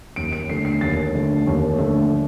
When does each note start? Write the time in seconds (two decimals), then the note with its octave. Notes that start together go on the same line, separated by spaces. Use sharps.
0.16 D#2 D7
0.33 D7
0.50 D3 A3 C7
0.65 C7
0.81 D#2 A6
1.15 D3 A3
1.47 D#2
1.79 D3 A3